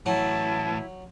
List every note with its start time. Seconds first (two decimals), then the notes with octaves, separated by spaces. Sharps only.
0.06 A2 E3 F#3 E4 A5